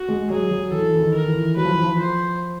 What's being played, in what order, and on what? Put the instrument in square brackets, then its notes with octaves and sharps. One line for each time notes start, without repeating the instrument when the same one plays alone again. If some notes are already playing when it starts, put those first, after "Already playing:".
Already playing: [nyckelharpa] F#4
[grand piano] G#3
[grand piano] F#3 [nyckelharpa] G#4
[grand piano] F#3
[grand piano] E3 [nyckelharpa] A4
[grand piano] E3
D#3
[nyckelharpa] A#4
[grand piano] E3
[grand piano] F#3 [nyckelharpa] B4
[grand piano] F3
E3
F3
[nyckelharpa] C5